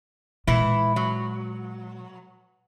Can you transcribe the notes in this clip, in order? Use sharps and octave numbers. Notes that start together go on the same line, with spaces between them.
A#2 E3 G#3 E4
F#3